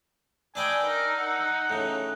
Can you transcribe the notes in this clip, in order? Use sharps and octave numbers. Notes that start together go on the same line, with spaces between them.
D4 B4 D5 D#5 G5 G#5 E6
D#4 A#4
F#5
A2 C#3 F#6